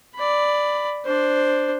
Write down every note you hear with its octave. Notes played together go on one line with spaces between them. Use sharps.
D5 B5
D4 C5